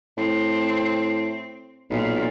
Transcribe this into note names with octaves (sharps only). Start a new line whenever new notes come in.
A2 C4
B1 A#2